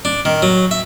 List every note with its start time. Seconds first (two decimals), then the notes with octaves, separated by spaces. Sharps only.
0.05 D4
0.25 D#3
0.42 F#3
0.71 E5